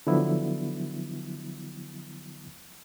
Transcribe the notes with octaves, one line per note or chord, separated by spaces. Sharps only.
D3 F3 F#3 B3 E4